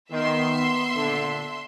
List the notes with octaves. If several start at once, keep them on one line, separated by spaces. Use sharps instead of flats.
D#3 B3 E5 C6
A#2 D3